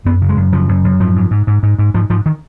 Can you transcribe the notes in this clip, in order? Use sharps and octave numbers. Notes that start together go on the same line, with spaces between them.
F#2 B3
C#3
G#3
F#2
C#3 F3
F#2
F#2
G#2 F3
G#2
G#2
G#2
G#2
G#2
G#2 F3
G#2 F3
D#3